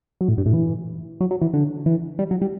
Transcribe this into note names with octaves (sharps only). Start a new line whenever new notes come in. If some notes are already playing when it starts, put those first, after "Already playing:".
F#3
A2
G2
A2
E3
F#3
F#3
E3
D3
E3
G3
F#3
G3